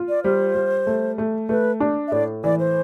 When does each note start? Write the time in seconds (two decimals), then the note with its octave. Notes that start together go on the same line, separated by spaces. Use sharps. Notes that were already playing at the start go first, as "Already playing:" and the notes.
Already playing: F4
0.09 D5
0.24 G3 C5
0.55 G3
0.87 A3
1.18 A3
1.49 A3 B4
1.80 D4
2.08 E5
2.12 A2 D5
2.44 E3 D5
2.59 C5